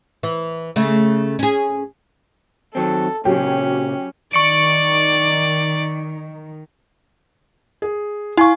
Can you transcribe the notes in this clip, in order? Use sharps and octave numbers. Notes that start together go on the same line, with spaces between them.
E3
C#3 A3
C#4 G#4
D#3 F#3 C4 A4
A#2 C#3 F#3 C#4 G4
D#3 D5 C#6 C#7 D7
G#4
E4 F5 G#5 C#6